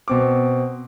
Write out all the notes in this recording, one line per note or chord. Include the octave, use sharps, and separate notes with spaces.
B2 C4 D6